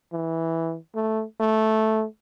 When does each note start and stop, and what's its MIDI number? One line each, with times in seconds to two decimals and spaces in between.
0.13 0.77 52
0.95 1.23 57
1.40 2.05 57